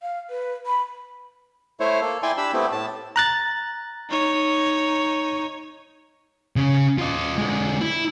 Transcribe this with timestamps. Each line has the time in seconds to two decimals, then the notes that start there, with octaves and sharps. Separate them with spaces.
0.02 F5
0.30 B4
0.66 B5
1.80 A3 E4 C5 C#5
2.01 A#3 A4
2.23 E4 D5 G5 G#5 C6
2.37 D4 G4 B5 E6
2.53 A3 B3 C4 E4 G4
2.72 A2 A5
3.16 A#5 F#6 A6
4.09 D#4 C#5
6.56 C#3
6.99 F4 D#5
7.38 D3 G#3
7.81 E4